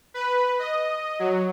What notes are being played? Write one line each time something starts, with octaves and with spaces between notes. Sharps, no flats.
B4
D#5
F#3